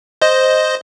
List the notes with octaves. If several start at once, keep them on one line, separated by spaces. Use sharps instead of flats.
C5 D#5